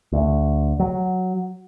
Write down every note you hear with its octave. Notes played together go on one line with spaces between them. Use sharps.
D2
F#3